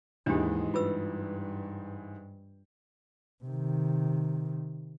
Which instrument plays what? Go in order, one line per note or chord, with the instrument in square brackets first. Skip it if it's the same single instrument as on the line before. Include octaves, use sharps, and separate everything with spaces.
[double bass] D#2 G#3 [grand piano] G#2 E3 [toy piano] D4 G4
[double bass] G2 [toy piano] F4 B4 E6
[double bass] C3 D#3